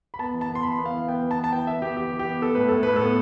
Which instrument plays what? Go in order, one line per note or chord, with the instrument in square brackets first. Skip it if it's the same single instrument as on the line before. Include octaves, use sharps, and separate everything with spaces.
[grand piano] B5
B3 A5
E3
A5
B3
C6
E3 B5
B3
F5
E3
B3 G5
E3
A5
B3
A5
E3 G5
B3 E5
B3 G4
E3 G4
E3
G4
B3
B3 A4
A2 B4
A2 A4
A2 B4
A4
B3